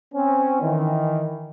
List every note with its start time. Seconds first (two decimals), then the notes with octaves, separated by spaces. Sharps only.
0.14 C4 C#4
0.61 D#3 E3